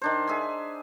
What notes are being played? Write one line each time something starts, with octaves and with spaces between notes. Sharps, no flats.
D#3 D4 C5
G#4 E5 G#5